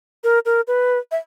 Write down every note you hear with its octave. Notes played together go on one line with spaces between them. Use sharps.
A#4
A#4
B4
E5